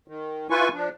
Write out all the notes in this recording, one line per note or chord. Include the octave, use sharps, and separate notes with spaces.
D#3
E4 F4 B4 G#5 C#6
F3 D4